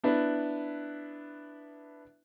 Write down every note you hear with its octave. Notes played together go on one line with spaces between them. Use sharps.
B3 D4 E4 B4